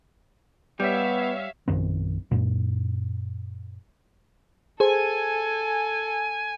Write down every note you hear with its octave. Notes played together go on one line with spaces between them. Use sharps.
G3 B3 C#5 E5 F5
A#1 F#2 D#3 C4
F#2 A#2
G#4 A4 C5 G#5